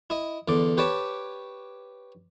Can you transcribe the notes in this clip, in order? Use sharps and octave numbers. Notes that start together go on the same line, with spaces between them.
E4 D#5
E2 D3 D5
G4 B4 C#5 D5 A5